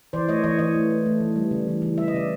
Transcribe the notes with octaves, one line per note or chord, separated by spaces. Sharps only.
E3 C5 D5
A3 C#5 D#5
E3 C#5 D#5
E3 C#5 D#5
A3
A3
A3
E3
G3
C#3
E3
E3
G3 E5
D#5
C#3 D5